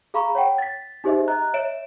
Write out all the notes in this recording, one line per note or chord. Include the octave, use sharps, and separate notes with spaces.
G#4 F5 A#5 B5 C#6
C#5 F#5 G5
A6 B6
D#4 G4 G#4 C5 D#5 E5
D#5 A#5 F#6
C#5 E5 D7 E7